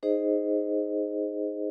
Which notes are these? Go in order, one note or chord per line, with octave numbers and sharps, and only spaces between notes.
D#4 G#4 C5 D#5